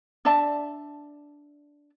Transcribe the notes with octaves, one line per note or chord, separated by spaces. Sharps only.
D4 D5 E5 A5